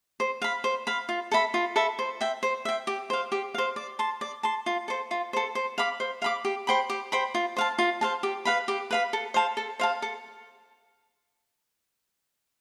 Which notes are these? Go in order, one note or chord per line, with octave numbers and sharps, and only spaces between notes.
C5
F5 B5
C5
F5 B5
F4
A4 E5 B5
F4
A4 E5 B5
C5
E5 G5
C5
E5 G5
G4
C5 F5
G4
C5 F5
D5
A5 C6
D5
A5 C6
F4
A4 C5
F4
A4 C5
C5
F5 B5 D6
C5
F5 B5 D6
G4
C5 G5 B5
G4
C5 G5 B5
F4
C5 F5 A5
F4
C5 F5 A5
G4
B4 F5 B5
G4
B4 F5 B5
A4
C5 F5 A5
A4
C5 F5 A5
A4